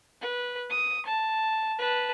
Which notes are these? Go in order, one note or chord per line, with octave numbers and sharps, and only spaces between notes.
B4
D#6
A5
B4 A5